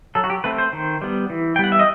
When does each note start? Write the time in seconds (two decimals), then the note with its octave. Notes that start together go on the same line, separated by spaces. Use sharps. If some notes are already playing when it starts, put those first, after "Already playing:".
0.15 F#3 A4
0.24 F#4
0.30 G4
0.44 A3 C4 B4
0.58 C5
0.73 D#3
1.02 G3 B3
1.30 E3
1.56 G5
1.59 G3 B3 F#5
1.72 E5
1.79 D#5